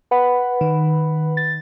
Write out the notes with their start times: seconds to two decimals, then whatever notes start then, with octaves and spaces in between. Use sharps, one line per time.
0.11 B4 F#5 B5
0.61 D#3
1.37 A6